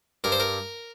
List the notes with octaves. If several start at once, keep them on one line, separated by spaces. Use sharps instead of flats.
G2 A#4
C5
A#4